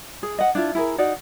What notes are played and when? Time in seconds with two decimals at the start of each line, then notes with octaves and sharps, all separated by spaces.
0.23 G#4
0.39 D#5 F#5
0.55 D4 E4 F4
0.75 E4 G#4 A#4
0.98 D#4 F#4 D5